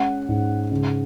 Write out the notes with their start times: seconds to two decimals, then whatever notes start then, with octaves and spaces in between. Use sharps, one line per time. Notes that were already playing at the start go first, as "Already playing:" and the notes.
Already playing: G#3 C#4 F#5
0.28 G#2
0.72 C#3